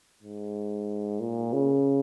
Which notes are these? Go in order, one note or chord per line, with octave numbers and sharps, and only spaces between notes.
G#2
A#2
C#3